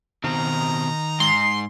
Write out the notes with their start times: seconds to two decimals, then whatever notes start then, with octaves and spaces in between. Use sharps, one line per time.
0.24 B2 D#3 C4 D#4 F5 A#5
1.20 G#2 C6